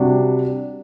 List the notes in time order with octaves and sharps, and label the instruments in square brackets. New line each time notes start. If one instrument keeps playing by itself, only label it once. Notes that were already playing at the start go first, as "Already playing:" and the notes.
Already playing: [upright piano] C3 G3 D4 F#4